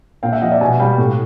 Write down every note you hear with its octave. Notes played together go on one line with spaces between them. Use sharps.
A#2 F5 G5
E5 F#5
F3 D#5 F5
D5 E5
B2 F#5 G#5
G3 F5 G5
A2